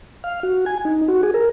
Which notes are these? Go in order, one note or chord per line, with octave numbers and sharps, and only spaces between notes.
F5
F#4
G#5
D#4
F#4
G#4
A#4